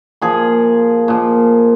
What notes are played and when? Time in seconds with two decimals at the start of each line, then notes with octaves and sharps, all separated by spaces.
0.22 A#2 F3 G#4
1.08 A#2 F3